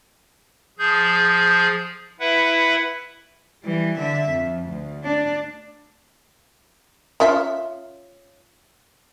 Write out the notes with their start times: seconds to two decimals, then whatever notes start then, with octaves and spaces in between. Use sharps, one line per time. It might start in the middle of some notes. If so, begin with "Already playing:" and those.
0.79 F3 G#4 G6
2.20 E4 B4 E5 F#5
3.64 E3 G3
3.98 D3 E5
4.31 F2
4.70 D2
5.04 D4
7.20 C#4 F4 E5